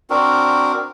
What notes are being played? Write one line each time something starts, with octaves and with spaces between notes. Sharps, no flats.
C4 D4 F#4 A#4